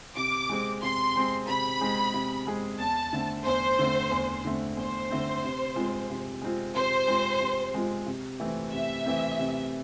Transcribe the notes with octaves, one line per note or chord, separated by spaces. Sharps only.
C3 D6
G#3 C4 G#4
C3 C6
G#3 C4 G#4
C3 B5
G#3 C4 G#4
C3
G#3 C4 G#4
E2 A5
D3 A3 C4
E2 C5
D3 A3 C4
E2
D3 A3 C4
E2 C5
D3 A3 C4
C3
G#3 C4 F4
C3
G#3 C4 F4
C3 C5
G#3 C4 F4
C3
G#3 C4 F4
C3
E3 A3 C4
C3 E5
E3 A3 C4
C3